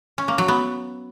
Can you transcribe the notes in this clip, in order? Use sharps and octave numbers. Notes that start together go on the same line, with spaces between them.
C#4
A#3
F#3
B3